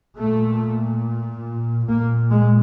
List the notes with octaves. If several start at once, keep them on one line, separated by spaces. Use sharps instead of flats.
A#2 A3
A#2 A#3
G#3